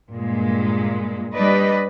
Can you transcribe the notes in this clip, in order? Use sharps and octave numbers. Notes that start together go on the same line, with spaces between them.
G2 A#2 G#3
G3 D4 B4 D5 D#5